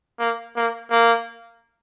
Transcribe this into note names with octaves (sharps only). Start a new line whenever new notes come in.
A#3
A#3
A#3